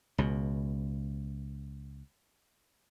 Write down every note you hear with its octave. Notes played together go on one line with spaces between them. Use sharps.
C#2 B2